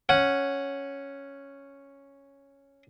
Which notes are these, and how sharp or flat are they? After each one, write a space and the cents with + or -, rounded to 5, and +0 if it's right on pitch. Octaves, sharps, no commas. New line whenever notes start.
C#4 +0 F#5 +0